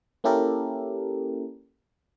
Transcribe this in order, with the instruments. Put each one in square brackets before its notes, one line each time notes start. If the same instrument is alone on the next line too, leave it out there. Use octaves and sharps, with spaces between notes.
[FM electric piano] A#3 C#4 E4 G4 A4 A#4